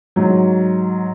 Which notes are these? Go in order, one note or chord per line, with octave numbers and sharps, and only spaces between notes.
G#2 F#3